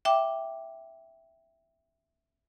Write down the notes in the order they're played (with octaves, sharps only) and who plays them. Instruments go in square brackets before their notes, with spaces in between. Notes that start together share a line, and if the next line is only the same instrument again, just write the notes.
[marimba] E5 G5 D6